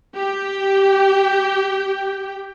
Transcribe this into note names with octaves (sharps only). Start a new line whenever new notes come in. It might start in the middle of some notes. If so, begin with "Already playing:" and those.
G4 G5